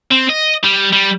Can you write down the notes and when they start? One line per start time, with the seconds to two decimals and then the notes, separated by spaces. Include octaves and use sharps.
0.11 C4
0.29 D#5
0.64 G3
0.93 G3